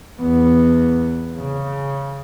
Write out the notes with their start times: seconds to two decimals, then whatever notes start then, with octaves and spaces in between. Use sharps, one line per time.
0.22 E2 B3
1.38 C#3